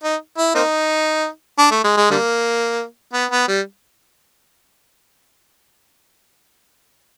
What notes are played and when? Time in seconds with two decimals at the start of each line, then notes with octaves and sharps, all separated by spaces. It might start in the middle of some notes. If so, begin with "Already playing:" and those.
0.03 D#4
0.38 E4
0.55 A#3 C4 D#4
1.58 D4
1.71 A3
1.84 G#3
1.97 G#3
2.10 D3 G3 A#3
3.13 B3
3.31 B3
3.48 G3